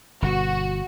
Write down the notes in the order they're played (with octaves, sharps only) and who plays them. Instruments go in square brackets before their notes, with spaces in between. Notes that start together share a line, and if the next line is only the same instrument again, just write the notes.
[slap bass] G1 B2 [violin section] F#4